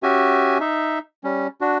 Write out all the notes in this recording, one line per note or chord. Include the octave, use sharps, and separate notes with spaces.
C#4 F#4 G4 E5 G#5
D#4 E5
G3 C#4
D4 F#4